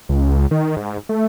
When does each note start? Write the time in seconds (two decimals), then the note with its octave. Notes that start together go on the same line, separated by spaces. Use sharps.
0.09 C#2
0.51 D#3
0.77 G#2
1.09 A3